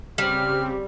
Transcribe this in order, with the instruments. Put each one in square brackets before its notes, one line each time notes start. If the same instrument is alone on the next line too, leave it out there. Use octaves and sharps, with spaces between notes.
[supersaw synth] C#3 C4 [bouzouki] G3 [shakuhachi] G4 [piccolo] F6